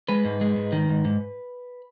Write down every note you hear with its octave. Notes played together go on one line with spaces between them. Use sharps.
G#3 B4
G#2
G#3
G#2
D#3
G#2
G#2